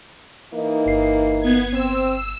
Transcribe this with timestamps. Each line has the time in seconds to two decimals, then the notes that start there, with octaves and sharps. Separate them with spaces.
0.53 E3 A#3 D#4
0.86 G1 C7
1.40 B3 G#6
1.73 C4 E6